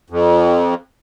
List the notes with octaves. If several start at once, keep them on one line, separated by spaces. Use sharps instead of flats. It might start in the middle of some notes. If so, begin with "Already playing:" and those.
F2